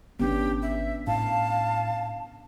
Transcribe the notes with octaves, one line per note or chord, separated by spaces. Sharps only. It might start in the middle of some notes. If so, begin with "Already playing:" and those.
G#1 B3 C#4 D4 G4
E5
A2 F5 A5